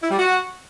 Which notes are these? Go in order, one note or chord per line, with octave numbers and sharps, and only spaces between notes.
E4
G3
F#4